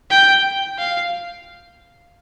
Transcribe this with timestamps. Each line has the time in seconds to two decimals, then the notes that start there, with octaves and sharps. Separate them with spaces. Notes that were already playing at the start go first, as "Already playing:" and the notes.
0.10 G5
0.78 F5